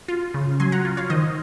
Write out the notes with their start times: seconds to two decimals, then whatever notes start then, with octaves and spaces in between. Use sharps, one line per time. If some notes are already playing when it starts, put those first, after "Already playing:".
0.08 F4
0.34 C#3
0.60 F#3 G#5 C6
0.72 F#5 A#5
0.85 F4
0.97 C#5 F5
1.10 D#3 C5 D#5